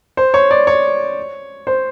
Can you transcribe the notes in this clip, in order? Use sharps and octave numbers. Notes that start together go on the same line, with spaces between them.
C5
C#5
D5
C#5
C5